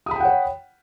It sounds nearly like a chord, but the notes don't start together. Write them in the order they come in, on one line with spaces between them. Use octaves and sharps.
D#6 B5 G5 F#5 C#5